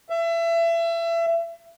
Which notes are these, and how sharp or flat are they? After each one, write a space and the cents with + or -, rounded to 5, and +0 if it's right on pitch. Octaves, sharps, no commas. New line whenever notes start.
E5 +30